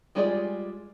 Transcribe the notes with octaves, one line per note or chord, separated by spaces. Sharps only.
G3 G#3 F4 G#4 D5